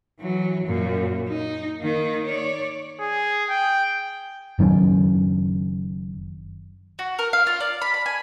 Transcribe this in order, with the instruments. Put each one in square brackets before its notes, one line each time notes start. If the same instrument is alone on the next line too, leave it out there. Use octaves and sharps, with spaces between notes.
[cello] E3 F#3
F#2 A#2
D#4
D#3 A#3
C#5 D5
[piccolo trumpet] G#4
G5
[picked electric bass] F#1 D#3 F#3 C#4
[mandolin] F#4
A#4
F5
F4
D5
B5
B5
G#5